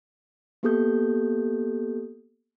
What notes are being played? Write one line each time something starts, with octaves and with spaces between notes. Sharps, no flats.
A#3 B3 G4 A4 D#6 G6